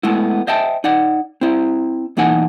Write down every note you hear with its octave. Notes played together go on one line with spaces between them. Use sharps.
G#3 A3 B3 E4
C5 D#5 E5 G5 A5
D#4 D5 F#5
C4 E4
B1 E3 A#3 D#4 F#5 G#5